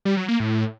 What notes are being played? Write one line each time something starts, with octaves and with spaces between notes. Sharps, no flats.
G3
F#3
A#3
A2